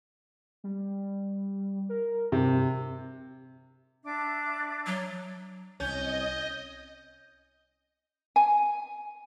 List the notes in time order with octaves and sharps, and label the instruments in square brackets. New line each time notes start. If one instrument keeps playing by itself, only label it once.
[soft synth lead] G3
A#4
[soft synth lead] G2 [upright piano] C3
[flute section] D4 E5 D6
[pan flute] F#3
[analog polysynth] C2 [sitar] C#4 [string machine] D#5 [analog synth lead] G6
[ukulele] G#5